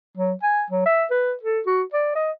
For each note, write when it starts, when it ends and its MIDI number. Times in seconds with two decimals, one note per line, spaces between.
0.17 0.33 54
0.43 0.64 80
0.70 0.85 54
0.86 1.05 76
1.11 1.34 71
1.43 1.60 69
1.66 1.83 66
1.93 2.11 74
2.15 2.31 75